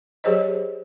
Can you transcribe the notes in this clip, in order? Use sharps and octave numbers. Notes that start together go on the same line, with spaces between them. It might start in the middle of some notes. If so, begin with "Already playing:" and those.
F#3 G4 G#4 C5 C#5 D#5